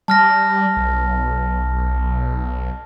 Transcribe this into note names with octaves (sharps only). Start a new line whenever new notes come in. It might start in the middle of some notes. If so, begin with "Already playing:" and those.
G3 A5 F6 A#6
B1